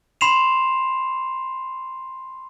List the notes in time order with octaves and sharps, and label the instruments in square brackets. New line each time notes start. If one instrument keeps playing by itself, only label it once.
[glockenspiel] B5 C6 C7 E7 F7